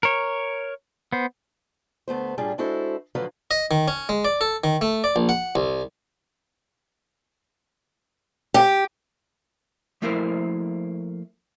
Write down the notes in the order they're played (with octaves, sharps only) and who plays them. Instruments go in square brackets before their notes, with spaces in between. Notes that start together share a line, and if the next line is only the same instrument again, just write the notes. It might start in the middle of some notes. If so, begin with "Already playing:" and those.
[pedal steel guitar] A#4 C#5
B3 C5
[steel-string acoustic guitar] D2 A3 B3 C5
A2 G3 D4 F4 G#4
G#3 D4 E4 F#4 A4 C5
A2 D3 F3 F#3 B4 F5
[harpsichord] D#5
D#3
C#4
G#3
D5
A4
D#3
A3
D5
A#1
F#5
C2
[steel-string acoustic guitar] G4
[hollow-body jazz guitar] F3 A3 A#3 E4 A#4 C5